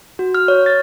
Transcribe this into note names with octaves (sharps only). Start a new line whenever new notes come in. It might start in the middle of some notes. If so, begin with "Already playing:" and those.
F#4
F6
C#5
A6